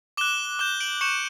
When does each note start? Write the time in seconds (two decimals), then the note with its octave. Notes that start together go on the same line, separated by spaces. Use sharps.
0.17 D6 F#6 E7 G7
0.59 D6 G6 E7 G7
0.81 D7 F#7
1.01 C#6 G6 C#7 E7